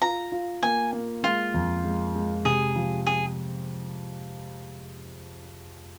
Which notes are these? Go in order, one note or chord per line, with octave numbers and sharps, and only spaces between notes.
F4 A#5
F4
A#3 G#5
A#3
G#3 F4
F2
G#3
G#3
C3 G#4
F3
G#4